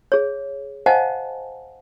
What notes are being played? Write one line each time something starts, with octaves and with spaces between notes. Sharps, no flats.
G#4 C#5
C5 D#5 F5 F#5 G#5 A5